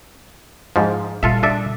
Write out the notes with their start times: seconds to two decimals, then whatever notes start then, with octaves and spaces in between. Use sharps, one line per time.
0.76 G#2 F3
1.23 A#2 G3 F4 A4 E5
1.43 D4 A4 E5